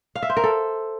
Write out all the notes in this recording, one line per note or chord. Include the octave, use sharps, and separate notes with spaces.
F5
E5
C5
A#4
A4